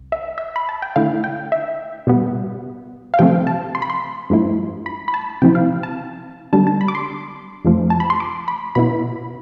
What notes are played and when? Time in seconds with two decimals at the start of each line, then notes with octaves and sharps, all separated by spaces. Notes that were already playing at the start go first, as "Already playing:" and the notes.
Already playing: C2
0.12 E5
0.38 E5
0.56 B5
0.69 A5
0.82 G5
0.96 D3 A3 E4 F5
1.24 G5
1.52 E5
2.07 B2 G3 B3
3.14 F5
3.19 C3 F3 A3 C4 G5
3.47 A5
3.75 C6
3.82 B5
3.90 C6
4.30 G2 F3 A3 E4
4.86 B5
5.08 B5
5.14 A5
5.42 C3 F3 C4 E4 G5
5.55 F5
5.83 A5
6.53 D3 G3 B3 A5
6.67 A5
6.81 B5
6.88 D6
6.95 C6
7.65 F2 C3 F3 A3
7.90 A5
8.00 B5
8.10 C6
8.20 D6
8.48 B5
8.75 B2 B3 E4 B5